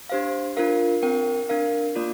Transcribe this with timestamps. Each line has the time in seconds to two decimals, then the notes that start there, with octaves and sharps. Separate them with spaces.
0.09 D4 G4 C5 F5
0.57 D4 F4 A#4 F5
1.03 C4 A#4 G5
1.49 D4 A#4 F5
1.96 A#3 F4 D5